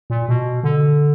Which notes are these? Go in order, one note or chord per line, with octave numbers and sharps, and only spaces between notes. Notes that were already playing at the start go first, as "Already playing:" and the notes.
A#2
B2
D3